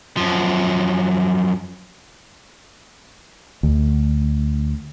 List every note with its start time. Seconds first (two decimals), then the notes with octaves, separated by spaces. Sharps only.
0.17 F#2 F3
3.63 D2